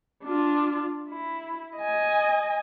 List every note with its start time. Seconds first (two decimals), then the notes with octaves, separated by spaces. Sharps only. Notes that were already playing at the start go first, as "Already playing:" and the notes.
0.23 D4 F4
1.09 E4
1.77 D#5 G#5